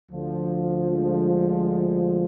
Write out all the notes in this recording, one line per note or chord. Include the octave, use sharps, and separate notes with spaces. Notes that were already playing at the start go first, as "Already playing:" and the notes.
D2 D3 F3
G#3